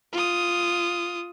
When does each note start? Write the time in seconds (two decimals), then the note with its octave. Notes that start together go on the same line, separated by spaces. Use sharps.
0.13 F4 D#6